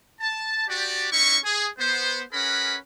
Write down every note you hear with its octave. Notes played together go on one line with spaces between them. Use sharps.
A5
F#4 G4 D5
C#4 D#4 E4 C#6
G#4
B3 C5
C#4 G#4 A#4 B4 F#5 B5